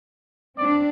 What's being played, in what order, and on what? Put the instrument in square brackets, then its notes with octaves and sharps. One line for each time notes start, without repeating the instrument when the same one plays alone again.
[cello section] C4 D4 [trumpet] D5